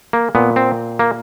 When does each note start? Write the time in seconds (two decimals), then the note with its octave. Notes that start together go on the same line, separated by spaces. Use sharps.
0.13 A#3
0.35 A#2 B3
0.56 C4
0.99 A#3